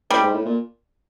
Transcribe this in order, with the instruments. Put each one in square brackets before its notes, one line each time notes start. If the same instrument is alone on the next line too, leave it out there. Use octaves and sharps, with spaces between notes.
[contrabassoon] A2 [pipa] G3
[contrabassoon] G#2
A2
A#2